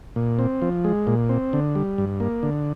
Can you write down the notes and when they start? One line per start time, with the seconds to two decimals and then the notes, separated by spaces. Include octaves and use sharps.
0.16 A#2
0.39 C4
0.62 F3
0.84 G#3
1.07 A#2
1.29 C4
1.53 D3
1.75 G3
1.98 G2
2.20 A#3
2.43 D3